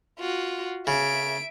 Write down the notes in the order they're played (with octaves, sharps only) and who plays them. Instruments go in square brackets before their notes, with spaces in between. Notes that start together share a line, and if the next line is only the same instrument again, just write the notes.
[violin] F4 F#4
[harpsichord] C#3 [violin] E5 D7